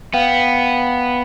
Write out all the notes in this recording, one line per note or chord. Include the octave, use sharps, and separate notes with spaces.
B3 F5 G5